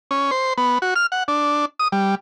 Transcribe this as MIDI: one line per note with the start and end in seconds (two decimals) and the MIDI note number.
0.11 0.31 61
0.31 0.53 72
0.58 0.78 59
0.82 0.94 66
0.96 1.06 89
1.12 1.23 78
1.28 1.65 62
1.79 1.88 87
1.92 2.15 55